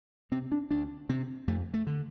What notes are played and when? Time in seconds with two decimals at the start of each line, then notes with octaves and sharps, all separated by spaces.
0.31 C3 C4
0.52 D4
0.71 D2 D4
1.09 C3 C4
1.47 F2 A3
1.74 A3
1.87 D3